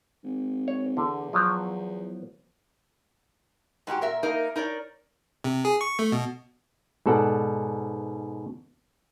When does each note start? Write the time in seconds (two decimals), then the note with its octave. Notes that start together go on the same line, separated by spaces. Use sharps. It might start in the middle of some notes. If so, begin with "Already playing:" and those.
0.24 G#1
0.68 C#5
0.97 E2 D3
1.33 F3 F#3
3.87 G#2 G#3 F#4 G4
4.01 A#2 A#4 E5
4.23 A#3 D#4 A#4
4.56 D#4 A#4 C#5 D5
5.44 C3
5.65 G#4
5.81 C#6
5.99 A3
6.12 B2
7.06 G#2 B2 A4 D5 F#5